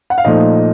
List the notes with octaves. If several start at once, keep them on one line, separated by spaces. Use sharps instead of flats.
F#5
F5
A#2 F3 A3 D#4 D#5